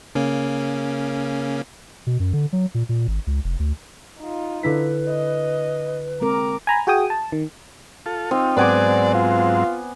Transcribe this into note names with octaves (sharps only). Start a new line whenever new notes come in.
C#3 A#3 C#4
B2
F#2
D3
F#3
A#2
A#2
G#1
C#2
F1
D2
D#4 F4
D3 E4 B4 B6
D#5
G#3 C4 A#4 A#5 D6
G#5 A#5 B5
F#4 G#4 G5 G#5 D#6
A5
D#3
F4 A4
C4 D#4 F4
G#2 F#3 B3 C4 D5 G#5 D6
F4